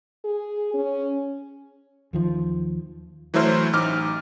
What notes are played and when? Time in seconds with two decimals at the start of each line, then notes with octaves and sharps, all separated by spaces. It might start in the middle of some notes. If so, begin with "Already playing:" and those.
0.25 G#4
0.74 C#4
2.13 D#2 D#3 F3
3.34 E3 F#3 A3 E4 C5 F6
3.73 A1 D#4 D6 F6